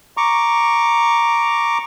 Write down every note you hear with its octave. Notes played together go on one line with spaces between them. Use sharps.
A#5 C#6 D6